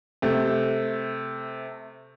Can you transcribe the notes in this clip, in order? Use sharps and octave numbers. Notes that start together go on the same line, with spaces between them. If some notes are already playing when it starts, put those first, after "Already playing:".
C3 A3